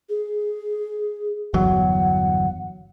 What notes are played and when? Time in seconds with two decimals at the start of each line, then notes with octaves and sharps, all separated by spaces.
0.09 G#4
1.54 G1 E2 F#3 F#5